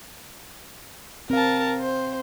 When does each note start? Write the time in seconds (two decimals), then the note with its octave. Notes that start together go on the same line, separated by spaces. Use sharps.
1.30 C4 A#4 F5 A5
1.81 C5